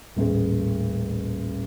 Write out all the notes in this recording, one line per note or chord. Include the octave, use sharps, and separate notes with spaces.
D#1 A1 G#4